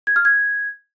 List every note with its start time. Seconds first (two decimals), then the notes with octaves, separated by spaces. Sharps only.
0.07 G#6
0.16 F6
0.25 G#6